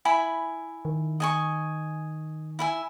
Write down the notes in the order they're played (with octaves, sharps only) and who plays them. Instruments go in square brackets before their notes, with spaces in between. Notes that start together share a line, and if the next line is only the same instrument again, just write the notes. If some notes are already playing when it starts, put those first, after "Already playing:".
[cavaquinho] E4 G#5 B5
[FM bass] D#3
[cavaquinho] D#5 G#5 C#6
E4 E5 G#5